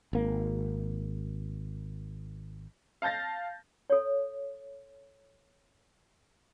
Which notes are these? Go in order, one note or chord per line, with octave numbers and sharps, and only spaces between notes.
G#1 A#3
F5 A5 G6 A6 A#6
A4 C#5